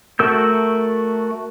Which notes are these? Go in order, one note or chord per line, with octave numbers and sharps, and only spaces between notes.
A3 F#4 A#4 E6 G6